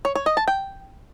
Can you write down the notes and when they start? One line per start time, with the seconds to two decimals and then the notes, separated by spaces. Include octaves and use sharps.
0.05 C#5
0.15 C#5
0.26 D#5
0.37 A5
0.48 G5